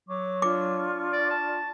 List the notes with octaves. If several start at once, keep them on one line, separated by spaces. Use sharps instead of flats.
F#3 C#6 D6
D4 F4 C#6 D6
D5
A5